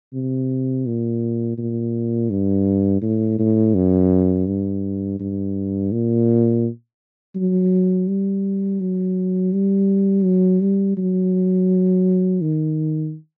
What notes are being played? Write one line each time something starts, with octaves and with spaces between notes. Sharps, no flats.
C3
A#2
A#2
G2
A2
A2
F#2
G2
G2
A#2
F#3
G3
F#3
G3
F#3
G3
F#3
D#3